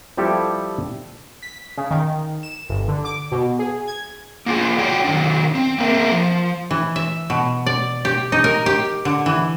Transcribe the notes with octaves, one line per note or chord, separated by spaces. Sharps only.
F3 G3 E4 G4 A4
B6
C#3
D#3
E7
G1
D3
D6
B2
G#4
G#6
A#3 F4 G#4
F#4 C#5 D5 G5
D#3 F#3 D4
C4
A#3 C4 A#4 D#5 E5
F3
E3
E5
B2
D5
G4
D#4
A#4
G4
D3
E3